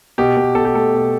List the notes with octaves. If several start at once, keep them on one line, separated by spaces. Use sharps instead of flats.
B2 G4
B2
B2 A4
G4
A3 A4
B2